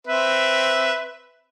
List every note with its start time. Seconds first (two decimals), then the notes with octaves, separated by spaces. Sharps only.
0.08 C4 B4 E5